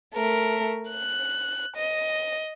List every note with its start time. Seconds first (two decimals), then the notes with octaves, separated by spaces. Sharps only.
0.15 A3 A#4
0.89 F#6
1.76 D#5